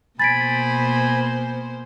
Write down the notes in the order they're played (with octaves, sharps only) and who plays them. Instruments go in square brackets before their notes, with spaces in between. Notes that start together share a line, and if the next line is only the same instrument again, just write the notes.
[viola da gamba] B2 A#3 C5 [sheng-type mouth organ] G#5 B5 [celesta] A6 B6 D7